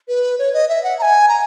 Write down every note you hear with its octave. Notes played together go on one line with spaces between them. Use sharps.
B4
C#5
D#5
E5
F#5
A#5
G#5
A#5